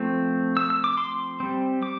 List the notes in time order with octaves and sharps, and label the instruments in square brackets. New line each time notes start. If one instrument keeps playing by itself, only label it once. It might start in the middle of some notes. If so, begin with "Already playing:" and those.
Already playing: [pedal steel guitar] F3 A3 C4
E6
E6
D6
C6
G3 C4
D6